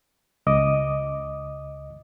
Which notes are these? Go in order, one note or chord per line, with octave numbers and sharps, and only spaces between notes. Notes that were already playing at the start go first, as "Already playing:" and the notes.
C#2 D#5 D6 D#6